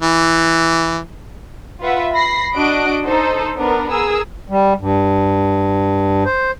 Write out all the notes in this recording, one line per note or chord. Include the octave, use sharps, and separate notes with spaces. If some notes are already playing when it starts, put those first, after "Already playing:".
E3
F4 B4 E5 F#5
B5 A#6 C7
D4 F#4 D#5 F#6 D7
D#4 A4 C5
B3 D4 A#4
G#4 A#4 E6
G3
G2
C5